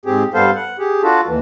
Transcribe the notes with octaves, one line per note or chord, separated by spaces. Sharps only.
G#2 C4 G4 G#4
G2 G3 B3 A4 C5 F5
F#5
G4 G#4
D4 F4 F#4 A4
D#2 E3